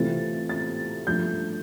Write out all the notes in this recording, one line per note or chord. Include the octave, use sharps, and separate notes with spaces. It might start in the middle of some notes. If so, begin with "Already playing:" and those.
Already playing: C3 E3 A3 C4 F4 A6
A6
G2 F3 A3 G6